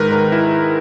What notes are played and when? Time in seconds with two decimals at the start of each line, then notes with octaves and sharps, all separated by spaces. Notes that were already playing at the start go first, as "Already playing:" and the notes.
Already playing: G#2 D#3 G#3 A#4 B4
0.12 A#4
0.32 E4